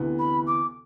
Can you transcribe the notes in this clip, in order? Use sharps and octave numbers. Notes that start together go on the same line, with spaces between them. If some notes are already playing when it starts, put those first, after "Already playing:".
Already playing: D2 C3 E3 B3
B5
D6